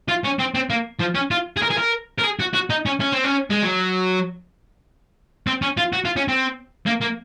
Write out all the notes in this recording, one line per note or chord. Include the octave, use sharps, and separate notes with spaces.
F4
C#4
C4
C4
A#3
F3
C#4
F4
G#4
A#4
G#4
A#4
A#4
G#4
F#4
F#4
D#4
C#4
C#4
C4
C#4
G#3
F#3
C4
C#4
F4
F#4
F4
C#4
C4
A#3
A#3